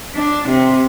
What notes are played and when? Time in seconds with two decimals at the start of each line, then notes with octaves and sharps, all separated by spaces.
0.15 D4
0.48 C3